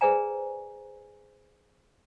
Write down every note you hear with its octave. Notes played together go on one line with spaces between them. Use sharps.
G#4 B4 C5 D5 G#5 A#5